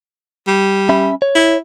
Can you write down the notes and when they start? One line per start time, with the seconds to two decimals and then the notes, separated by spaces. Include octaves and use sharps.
0.47 G3
0.89 C#4 E5 B5
1.22 C#5
1.35 E4